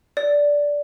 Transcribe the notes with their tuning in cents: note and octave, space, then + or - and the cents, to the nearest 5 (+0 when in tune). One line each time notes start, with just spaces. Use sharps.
D5 -10